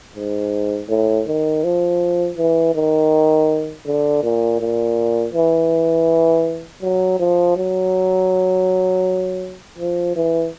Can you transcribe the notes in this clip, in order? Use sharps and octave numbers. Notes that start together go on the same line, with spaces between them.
G#2
A2
D#3
F3
E3
D#3
D3
A#2
A#2
E3
F#3
F3
F#3
F3
E3